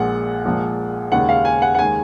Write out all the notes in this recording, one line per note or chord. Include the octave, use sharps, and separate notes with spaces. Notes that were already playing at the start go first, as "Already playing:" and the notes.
Already playing: A#1 A#2 G#3 F#5
A#1 A#2 F3 G#3
D#2 C#3 G#3 F#5
F5
G#5
F#5
F#5
D#2 D#3 G#3 G#5